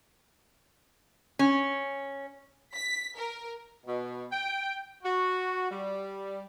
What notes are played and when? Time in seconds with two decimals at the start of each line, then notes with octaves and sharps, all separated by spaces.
1.39 C#4
2.75 B6
3.17 A#4
3.85 B2
4.30 G5
5.03 F#4
5.70 G3